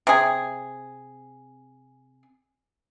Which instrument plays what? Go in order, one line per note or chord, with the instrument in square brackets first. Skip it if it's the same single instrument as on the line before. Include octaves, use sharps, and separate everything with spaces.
[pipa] C3 G#4